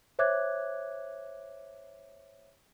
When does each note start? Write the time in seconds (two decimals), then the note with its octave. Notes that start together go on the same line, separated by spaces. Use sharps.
0.19 C5 C#5 E5 D6 F#6 G#6